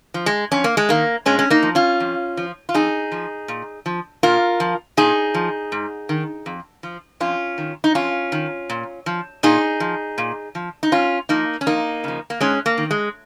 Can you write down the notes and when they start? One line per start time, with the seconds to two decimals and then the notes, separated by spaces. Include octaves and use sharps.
0.14 F3
0.26 G#3
0.51 F2 C#4
0.64 A#3
0.77 G#3
0.89 D#3 A#3
1.26 A#2 G#3 C#4
1.39 C#4
1.50 A#3 D#4
1.63 F3
1.75 C#4 F4
2.00 F2
2.37 F3
2.69 F4
2.74 F2 D#4 G#4
3.12 F3
3.48 A#2
3.86 F3
4.23 A#2 F4 A#4
4.60 F3
4.97 A#2 D#4 G#4
5.34 F3
5.72 G#2
6.09 D#3
6.46 F2
6.83 F3
7.20 F2 C#4 F4
7.58 D#3
7.84 D#4
7.95 F2 C#4 F4
8.32 D#3
8.70 A#2
9.06 F3
9.43 A#2 D#4 G#4
9.80 F3
10.18 A#2
10.55 F3
10.83 D#4
10.92 G#2 C#4 F4
11.29 F3 A#3 D#4
11.61 C#4
11.66 F2 A#3 D#4
12.04 C#3 F3
12.30 A#3
12.40 G#2 G#3 C#4
12.66 A#3
12.78 D#3
12.91 G#3